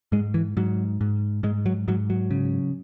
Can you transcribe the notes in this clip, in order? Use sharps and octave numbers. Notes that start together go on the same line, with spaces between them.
G#2 G#3
E3
G#2 F#3
G#2
G#2 G#3
F#3
G#2 F#3
F#3
C#3